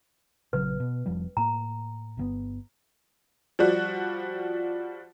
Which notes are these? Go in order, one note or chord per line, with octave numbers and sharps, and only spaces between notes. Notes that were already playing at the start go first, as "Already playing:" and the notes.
A#1 C#3 F#3 B4
B2
F1 F3 G3
A2 A#3 A#5
G1 B2 B3
F3 G3 F#4